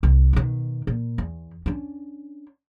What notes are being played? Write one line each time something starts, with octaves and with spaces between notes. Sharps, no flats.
C2
B2 D#3
A#2
E2
C#4 D4